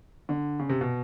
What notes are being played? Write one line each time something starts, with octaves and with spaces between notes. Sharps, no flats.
D3
C#3
C3
B2